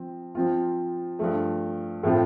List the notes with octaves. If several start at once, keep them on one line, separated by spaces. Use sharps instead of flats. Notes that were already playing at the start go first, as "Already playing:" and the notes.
Already playing: F3 C4
F3 C4 F4
G2 F3 A3
A2 F3 A3 C4 F4